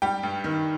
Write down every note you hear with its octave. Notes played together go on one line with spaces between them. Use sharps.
G3 G4 G5
G2
D#3